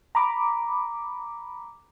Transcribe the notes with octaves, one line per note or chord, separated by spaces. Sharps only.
A#5 B5 D6